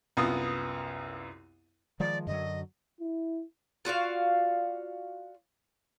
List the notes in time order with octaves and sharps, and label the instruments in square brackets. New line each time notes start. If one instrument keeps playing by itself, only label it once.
[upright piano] C2 F#2 B3 F4 D#6
[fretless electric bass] D#3 F3 G#3 [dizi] D5
[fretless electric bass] F#2 D3 F#3 [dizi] D#5
[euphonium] E4
[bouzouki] F4 F#4 D5 F5